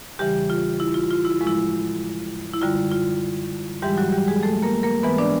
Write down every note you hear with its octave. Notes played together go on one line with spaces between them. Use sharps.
E2 C#3 E3 G3 G4
F4
E4
F4
F4
E4
A2 F3 G#3
E4
E4
F#2 D3 G3 F4
F4
G#2 E3 G3 G#3 G4
F#3 F#4
G3 G4
G#3 G#4
A3 A4
A#3 A#4
A#3 A#4
G#2 E3 G#3 B3 B4
D4 D5